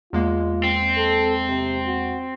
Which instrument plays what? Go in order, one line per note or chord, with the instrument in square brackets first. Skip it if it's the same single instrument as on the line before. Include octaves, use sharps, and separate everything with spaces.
[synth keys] E2 G#3 A#3 [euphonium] F4
[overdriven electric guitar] C4
[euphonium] A4
C3
F#4